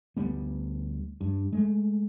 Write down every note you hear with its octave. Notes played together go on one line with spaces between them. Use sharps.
D2 G3 B3
G2
G#3 A3